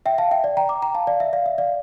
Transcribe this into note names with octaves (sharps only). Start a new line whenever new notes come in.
E5 G5
F5 A5
E5 G5
D5
G5 A#5
A#5 D6
G5 A#5
F5 A5
D5 F5
E5
D5 F5
E5
D5 F5